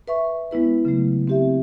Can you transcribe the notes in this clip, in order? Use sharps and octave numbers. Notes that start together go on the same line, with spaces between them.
B4 E5 C#6
G#3 B3 E4 B4
C#3 F#3 A3
C4 G4 E5